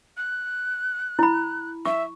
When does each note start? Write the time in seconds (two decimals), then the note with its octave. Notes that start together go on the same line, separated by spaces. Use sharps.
0.17 F#6
1.19 E4 B5
1.86 E5 C#6